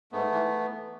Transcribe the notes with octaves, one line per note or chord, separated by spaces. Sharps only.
G#2 A3 B3
E3